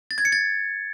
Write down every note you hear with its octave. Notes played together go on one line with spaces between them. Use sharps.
A6
G#6
C#7
A6